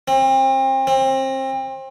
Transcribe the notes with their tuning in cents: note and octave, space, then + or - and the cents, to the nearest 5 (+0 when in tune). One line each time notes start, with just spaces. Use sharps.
C4 +35
C4 +30